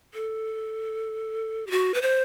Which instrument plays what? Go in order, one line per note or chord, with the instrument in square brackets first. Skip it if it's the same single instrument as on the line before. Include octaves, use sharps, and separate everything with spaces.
[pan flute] A4
G4
F#4
B4
C5